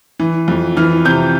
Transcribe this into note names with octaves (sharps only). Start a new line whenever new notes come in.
E3
F2
E3 F6
C3 G6